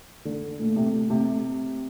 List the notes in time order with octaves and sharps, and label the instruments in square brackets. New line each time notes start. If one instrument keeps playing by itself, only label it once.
[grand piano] D3
[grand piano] A#2 [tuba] A3
[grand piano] C3
C3